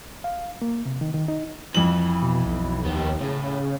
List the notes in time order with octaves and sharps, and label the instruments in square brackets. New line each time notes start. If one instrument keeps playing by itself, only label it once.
[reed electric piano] F5
A#3
C3
D#3
D#3
D#4
[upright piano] F2 F#7 [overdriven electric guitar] E3
[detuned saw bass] B2
B1
[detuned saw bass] D#2 [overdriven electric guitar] B3 G4
[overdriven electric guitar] A2 [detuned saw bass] C#3